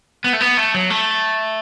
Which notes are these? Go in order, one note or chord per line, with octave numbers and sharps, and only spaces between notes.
B3
A3
B3
A3
F#3
A3